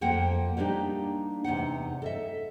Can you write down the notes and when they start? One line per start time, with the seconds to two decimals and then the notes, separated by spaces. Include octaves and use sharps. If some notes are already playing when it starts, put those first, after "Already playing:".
0.01 F2 F3 A#3 F#5 G5
0.57 G3 A#3 D4 D#4 G4
1.44 E2 C3 D#4 F#5
2.02 A4 D#5 E5